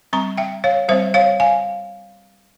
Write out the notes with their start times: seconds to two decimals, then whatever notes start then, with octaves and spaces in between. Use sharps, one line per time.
0.13 G3 C4 A#5 C#6
0.37 E5 G5
0.64 C#5 F5
0.88 G3 C4 C5 E5
1.14 C#5 F5
1.40 F5 G#5